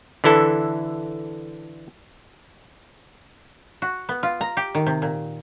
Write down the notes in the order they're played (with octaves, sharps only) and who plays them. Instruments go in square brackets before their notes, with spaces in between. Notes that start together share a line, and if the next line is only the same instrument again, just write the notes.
[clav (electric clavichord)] D3 E3 E4 A4
[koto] F#4
B3
F4
A#5
G4
D#3
C3
A#2